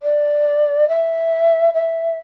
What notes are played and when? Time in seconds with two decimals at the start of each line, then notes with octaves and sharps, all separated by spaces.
0.02 D5
0.88 E5
1.74 E5